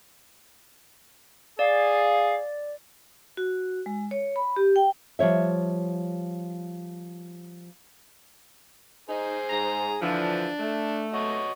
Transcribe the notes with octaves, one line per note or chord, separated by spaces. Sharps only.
G#4 D5 F5
F#4
G#3
C#5
B5
G4
G5
F3 G3 C#5 E5
D#4 G#4 C5
G#2 A#5
D3 E3 F3 D4
A3
F#4 C#5 D#5